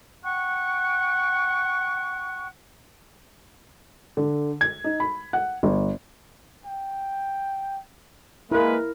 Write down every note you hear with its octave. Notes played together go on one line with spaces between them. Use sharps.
F#5 G5 C#6 F#6
D3
G#6
D#4
B5
F#5
G1
G5
G#3 A#3 E4 A#4 B4